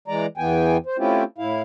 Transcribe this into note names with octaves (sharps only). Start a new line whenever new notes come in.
E3 G#3 D5 A#5
E2 E3 B3 G5 G#5
C5
A3 C4 C#4 E4 F4 G4
A2 E4 F5